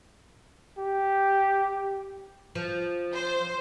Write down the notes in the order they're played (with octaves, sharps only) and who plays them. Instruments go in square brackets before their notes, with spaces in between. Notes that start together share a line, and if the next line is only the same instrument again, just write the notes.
[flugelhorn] G4
[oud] F3
[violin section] C5